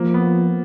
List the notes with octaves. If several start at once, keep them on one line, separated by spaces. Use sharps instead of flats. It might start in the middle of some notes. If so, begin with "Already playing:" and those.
Already playing: F3 A#3
B3